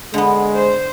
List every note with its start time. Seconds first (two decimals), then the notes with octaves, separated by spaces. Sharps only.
0.14 D3 G#3 B3
0.56 C5